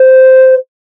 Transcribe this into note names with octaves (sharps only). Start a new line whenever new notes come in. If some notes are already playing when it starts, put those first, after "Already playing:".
Already playing: C5